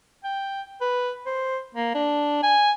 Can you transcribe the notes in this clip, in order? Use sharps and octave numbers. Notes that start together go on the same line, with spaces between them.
G5
B4
C5
A#3
D4
G#5